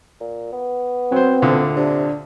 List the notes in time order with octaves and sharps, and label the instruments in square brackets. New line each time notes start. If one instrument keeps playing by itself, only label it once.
[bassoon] A#2
B3
[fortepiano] F#3 C5 [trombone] C4
[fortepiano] D2 A#2 D3
[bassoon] C3 [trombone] D4